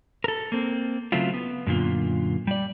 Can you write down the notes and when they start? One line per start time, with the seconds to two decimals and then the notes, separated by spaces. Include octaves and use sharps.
0.24 A4 A#4
0.52 A#3 C4
1.12 C#3 F#3 A3 C4 E4 F4
1.34 B3
1.67 F#2 A#2 D3 F4
2.47 G3 D5